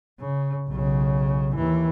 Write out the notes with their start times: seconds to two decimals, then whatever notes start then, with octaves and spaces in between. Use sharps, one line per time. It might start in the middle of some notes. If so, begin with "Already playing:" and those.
0.20 C#3
0.68 B1 C#3
1.55 D#2 E3